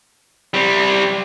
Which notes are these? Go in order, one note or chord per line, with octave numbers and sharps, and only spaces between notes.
G3 C4